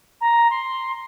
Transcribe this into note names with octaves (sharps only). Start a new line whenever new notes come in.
A#5
C6